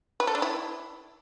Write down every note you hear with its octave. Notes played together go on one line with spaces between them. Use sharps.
B4
A4
D4
E4